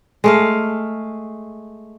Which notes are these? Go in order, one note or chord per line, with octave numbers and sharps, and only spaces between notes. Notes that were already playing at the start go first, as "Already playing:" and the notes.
G#3 A3 F5